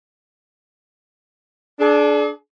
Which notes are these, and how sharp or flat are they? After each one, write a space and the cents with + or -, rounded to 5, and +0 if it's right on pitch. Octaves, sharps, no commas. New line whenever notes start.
D4 +0 G#4 +40